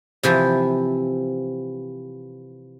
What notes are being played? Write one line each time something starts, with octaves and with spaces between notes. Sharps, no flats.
C3 E3 F3